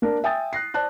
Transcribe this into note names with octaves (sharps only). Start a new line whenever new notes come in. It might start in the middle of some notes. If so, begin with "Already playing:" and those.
A#3 D4 A#4
E5 G5 G#5 D#6 A6
F#6 A#6 C7
C5 D5 A5 F#6